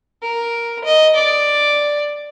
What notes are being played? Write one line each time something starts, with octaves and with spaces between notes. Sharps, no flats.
A#4
D#5
D5